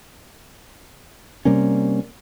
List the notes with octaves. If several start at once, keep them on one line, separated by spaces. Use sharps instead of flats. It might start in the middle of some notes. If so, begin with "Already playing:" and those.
C3 G3 A#3 C#4